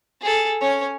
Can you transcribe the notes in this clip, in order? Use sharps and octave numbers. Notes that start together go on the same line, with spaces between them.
G#4 A4
C#4 C#5